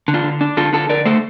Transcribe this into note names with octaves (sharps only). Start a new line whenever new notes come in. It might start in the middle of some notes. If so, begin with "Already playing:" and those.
D3
D4 F4
D3
D4
D3 F4 A4
D3 F4 A4
D3 A#4 D5
A3 A4 C5